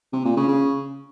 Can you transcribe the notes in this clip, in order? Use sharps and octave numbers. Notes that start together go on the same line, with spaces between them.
C3
A#2
C#3
C#3